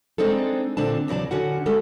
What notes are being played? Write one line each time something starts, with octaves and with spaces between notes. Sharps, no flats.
G#3 C4 D4 D#4 A4
A#2 D3 C4 D4 A5
E2 C#3 F#3 D5 A5
D3 C#4 F#4 F#5
G3 G#3 A4